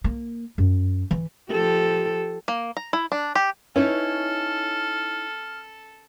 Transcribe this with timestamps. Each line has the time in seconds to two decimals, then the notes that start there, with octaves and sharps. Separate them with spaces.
0.04 A#3
0.58 F#2
1.11 E3
1.51 F3 G4 A4
2.48 A#3
2.77 A#5
2.93 E4
3.12 D4
3.35 G4
3.76 C#4 D#4 E4 A4 B4 C#5 F6